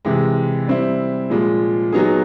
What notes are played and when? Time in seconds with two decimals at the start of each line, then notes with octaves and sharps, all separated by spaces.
0.05 C3 E3 G#3
0.67 G3 C4 E4
1.30 A#2 F3 G#3
1.92 F#3 B3 D#4 G#4